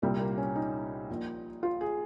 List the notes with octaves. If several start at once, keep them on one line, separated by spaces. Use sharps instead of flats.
C2 A#2 G3
A#3
C#4
D#4
A#1 A#2
F4
G#4